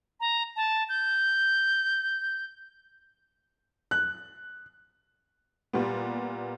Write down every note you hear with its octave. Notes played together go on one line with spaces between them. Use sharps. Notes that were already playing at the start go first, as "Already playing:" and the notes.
A#5
A5
G6
F#6
A#2 G3 B3